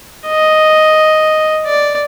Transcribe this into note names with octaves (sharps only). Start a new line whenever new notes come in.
D#5
D5